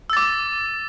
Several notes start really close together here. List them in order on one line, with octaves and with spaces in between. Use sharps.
E6 A6 D6